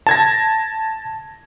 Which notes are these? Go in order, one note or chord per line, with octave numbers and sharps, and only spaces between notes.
A5 G#6 A#6